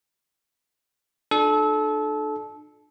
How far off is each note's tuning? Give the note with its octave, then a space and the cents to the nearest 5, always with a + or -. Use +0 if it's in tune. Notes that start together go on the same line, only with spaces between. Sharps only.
D4 +35 F4 +30 A4 -25